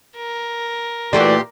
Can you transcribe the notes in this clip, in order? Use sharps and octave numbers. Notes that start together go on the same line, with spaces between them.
A#4
A#2 E3 A3 F#4 G4 D5 C6